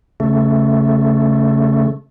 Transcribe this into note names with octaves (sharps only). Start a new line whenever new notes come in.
C#3 A3